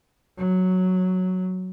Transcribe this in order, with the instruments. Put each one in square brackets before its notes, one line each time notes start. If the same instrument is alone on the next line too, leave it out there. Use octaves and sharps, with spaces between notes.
[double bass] F#3